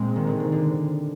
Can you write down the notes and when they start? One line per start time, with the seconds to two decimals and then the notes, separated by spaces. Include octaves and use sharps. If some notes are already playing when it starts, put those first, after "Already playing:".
Already playing: A#2 G#3 C4
0.16 D#3
0.27 D3
0.40 C3
0.52 D3